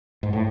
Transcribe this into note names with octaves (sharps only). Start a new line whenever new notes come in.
G#2
A2